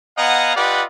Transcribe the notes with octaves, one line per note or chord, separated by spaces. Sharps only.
B3 D#5 F5 F#5 G#5 A#5
F4 G4 B4 D5 D#5 F#5